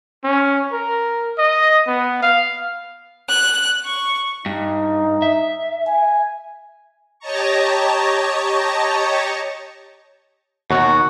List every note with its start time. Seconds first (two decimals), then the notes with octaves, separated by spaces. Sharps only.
0.24 C#4
0.72 A#4
1.39 D#5
1.87 B3
2.22 F5
3.29 F#6
3.84 C#6
4.46 G2 D#4
5.22 E5
5.87 G#5
7.19 G4 C#5 D#5 A5 A#5 C#6
10.71 D#2 B2 D#3 F#4